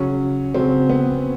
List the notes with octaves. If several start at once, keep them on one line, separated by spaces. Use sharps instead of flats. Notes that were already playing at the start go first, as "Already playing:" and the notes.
Already playing: C#3 F#3 C#4
C#3 F#3 C4
B3